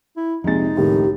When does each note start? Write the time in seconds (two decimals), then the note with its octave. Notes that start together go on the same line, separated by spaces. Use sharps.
0.17 E4
0.44 A#1 F2 C3 G#3 D#4 A6
0.76 C#2 A2 D#3 G4